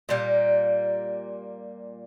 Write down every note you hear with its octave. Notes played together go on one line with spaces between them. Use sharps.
A#2 G3 A#3